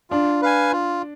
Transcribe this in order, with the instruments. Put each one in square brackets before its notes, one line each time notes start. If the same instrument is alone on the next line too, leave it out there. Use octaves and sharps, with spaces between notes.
[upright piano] D4 [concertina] F4
[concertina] B4 F5 G#5
F4